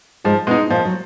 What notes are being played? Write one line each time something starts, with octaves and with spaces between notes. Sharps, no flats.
G#2 F3 G#3
B2 G#3 B3 D#4
A#2 F3 A#3
F#3